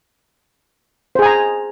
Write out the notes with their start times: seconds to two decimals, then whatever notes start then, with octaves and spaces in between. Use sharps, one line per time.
1.15 C5
1.19 G#4
1.22 G#5
1.26 A#5